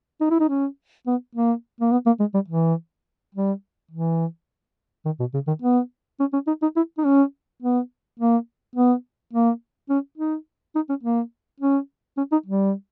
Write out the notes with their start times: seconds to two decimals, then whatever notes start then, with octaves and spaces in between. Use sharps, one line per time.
0.21 D#4
0.31 E4
0.40 D#4
0.49 C#4
1.07 B3
1.35 A#3
1.80 A#3
1.92 B3
2.06 A#3
2.20 G#3
2.34 G3
2.48 E3
3.35 G3
3.91 E3
5.05 D#3
5.20 B2
5.34 C#3
5.48 D#3
5.62 B3
6.20 C#4
6.33 C#4
6.47 D#4
6.62 D#4
6.77 E4
6.98 D#4
7.05 C#4
7.62 B3
8.19 A#3
8.76 B3
9.33 A#3
9.90 C#4
10.18 D#4
10.75 D#4
10.89 C#4
11.03 A#3
11.60 C#4
12.17 C#4
12.32 D#4
12.46 G3